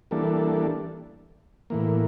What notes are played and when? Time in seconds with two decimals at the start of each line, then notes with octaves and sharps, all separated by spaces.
0.11 E3 G3 A#3 D4 A4
1.70 A2 E3 A#3